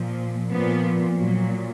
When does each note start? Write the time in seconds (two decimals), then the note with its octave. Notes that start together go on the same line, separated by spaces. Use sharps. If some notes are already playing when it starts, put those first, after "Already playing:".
Already playing: A#2 F3
0.50 A#2 F3 B3
1.18 A#2 F#3